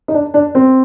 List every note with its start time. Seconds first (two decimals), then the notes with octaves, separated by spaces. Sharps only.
0.08 D#4
0.14 D4
0.34 D4
0.55 C4